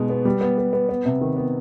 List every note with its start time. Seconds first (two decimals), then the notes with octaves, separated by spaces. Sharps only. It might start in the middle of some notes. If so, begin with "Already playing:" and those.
Already playing: B2 G#3 D#4
0.10 B3
0.25 G3
0.41 B3
0.58 B3
0.73 B3
0.89 B3
1.05 C3
1.21 D#3
1.37 B3